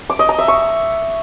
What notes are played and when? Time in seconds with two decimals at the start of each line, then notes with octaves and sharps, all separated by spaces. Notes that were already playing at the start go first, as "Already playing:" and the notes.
0.10 D6
0.19 D#5
0.29 A#5
0.39 E5
0.48 C#6